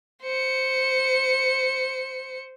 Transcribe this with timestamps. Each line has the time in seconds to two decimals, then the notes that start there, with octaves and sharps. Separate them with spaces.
0.23 C5 C#7